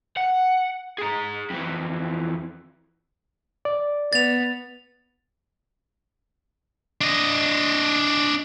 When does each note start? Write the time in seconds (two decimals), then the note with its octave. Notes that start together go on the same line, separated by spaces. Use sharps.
0.17 F#5
0.98 G#4 A#5
1.50 F2 E3
3.65 D5
4.13 B3 A6 F7
7.01 D4 D#5